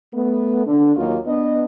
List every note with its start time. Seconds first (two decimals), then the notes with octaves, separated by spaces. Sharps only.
0.14 A3 B3
0.67 D3
0.96 D#2 F#3 A#3 D#4 F4 F#4
1.26 B3 D4 D#5